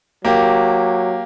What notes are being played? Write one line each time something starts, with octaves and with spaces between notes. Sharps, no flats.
F#3 A#3 G4